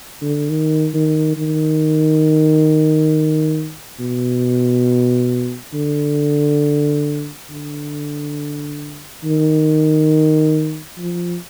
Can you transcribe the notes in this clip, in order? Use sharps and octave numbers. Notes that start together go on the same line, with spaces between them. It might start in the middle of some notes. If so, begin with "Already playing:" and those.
D3
D#3
D#3
D#3
B2
D3
D3
D#3
F3